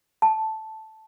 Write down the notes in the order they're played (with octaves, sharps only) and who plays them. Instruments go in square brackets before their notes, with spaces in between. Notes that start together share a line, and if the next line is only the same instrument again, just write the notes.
[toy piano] A5